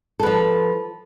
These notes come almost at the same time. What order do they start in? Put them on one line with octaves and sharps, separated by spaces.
A4 B4 F3